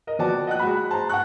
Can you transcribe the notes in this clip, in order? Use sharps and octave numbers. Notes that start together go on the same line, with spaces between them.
A#4 D#5
F3 B3 F#4 D5 G5 A5
D#5 F#5 G5 F#6
G#3 F#4 B5
C5 A5 A#5
F#5 G5 A5 C#6 F#6